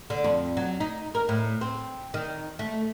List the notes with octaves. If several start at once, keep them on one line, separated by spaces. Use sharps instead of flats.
D3
F2
F#3
D#4
A#4
A2
C4
D#3
A3